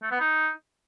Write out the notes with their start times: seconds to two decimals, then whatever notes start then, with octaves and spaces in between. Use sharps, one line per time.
0.02 A3
0.11 B3
0.20 D#4